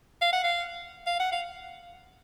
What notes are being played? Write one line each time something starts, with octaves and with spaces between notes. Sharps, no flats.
F5
F#5
F5
F5
F#5
F5